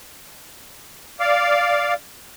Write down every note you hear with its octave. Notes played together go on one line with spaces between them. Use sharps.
D5 F5